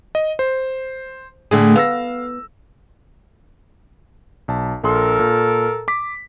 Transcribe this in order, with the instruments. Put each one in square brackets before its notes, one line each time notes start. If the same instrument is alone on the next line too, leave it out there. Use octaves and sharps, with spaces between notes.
[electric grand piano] D#5
C5
[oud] A2 A3 [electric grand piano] D3 G#4
[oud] B3 [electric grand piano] F5 E6 A#6
[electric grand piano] B1 A5
[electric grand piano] A#1 C6 [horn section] A4 A#4
[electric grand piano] A#2
D6 B6